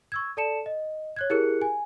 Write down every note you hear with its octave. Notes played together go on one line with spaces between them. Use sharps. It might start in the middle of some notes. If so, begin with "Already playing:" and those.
C#6 E6 G#6
A4 D5 A5 C#7 E7
D#5
C#5 F#6 G#6
E4 G4 G#4 A#4 F#6 C#7
G#5